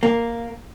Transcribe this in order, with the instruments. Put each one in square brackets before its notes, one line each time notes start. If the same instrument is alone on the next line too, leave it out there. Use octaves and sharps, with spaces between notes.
[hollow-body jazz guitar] A#3